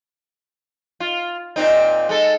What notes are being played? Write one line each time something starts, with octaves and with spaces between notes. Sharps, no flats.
F4
A#2 C4 D#4
G#3 A4